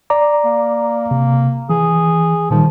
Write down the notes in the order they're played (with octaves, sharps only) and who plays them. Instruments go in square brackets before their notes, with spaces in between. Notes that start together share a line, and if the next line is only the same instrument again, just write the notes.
[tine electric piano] D5 A#5 D6
[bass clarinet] A#3
[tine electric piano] C3
[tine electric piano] E3 [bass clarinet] G#4
[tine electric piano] A#2 D#3 G3 [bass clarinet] F3